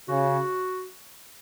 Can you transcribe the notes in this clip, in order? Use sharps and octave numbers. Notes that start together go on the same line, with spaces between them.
C#3 F#4